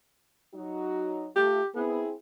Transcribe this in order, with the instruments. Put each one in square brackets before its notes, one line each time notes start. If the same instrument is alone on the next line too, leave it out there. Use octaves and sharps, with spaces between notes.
[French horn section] F#3 D#4 F#4
[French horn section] A3 F4 [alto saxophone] G4
[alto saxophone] B3 [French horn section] C4 E4 G#4